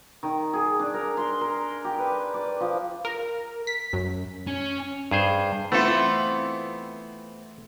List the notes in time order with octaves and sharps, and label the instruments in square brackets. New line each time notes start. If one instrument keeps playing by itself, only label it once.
[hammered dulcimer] D#3
G#4
D4
A#4
C6
A#4
G4
B4
D5
F3
[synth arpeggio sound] A#4
B6
F#2
[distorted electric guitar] C#4
[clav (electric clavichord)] G2 G#4 C5
[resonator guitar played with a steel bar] E3 F4 [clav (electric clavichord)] A3 A4 [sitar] B3 C4